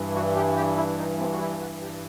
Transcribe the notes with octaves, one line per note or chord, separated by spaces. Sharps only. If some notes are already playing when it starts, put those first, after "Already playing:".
Already playing: G2 E3
F#4
G4
G4
E4
D#4
C4
F#4
E4
F#4
G4